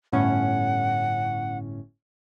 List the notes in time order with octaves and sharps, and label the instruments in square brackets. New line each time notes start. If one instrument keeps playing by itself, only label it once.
[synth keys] G1 A2 C#4 [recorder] F#5